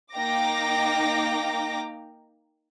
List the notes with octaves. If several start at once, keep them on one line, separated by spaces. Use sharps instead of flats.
A#3 D#4 G5 A#5 D6 A#6